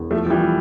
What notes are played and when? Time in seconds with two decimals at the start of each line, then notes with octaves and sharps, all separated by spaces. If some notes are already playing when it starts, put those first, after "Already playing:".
Already playing: E1 E2
0.11 F3 A3
0.26 F3
0.30 E3 G3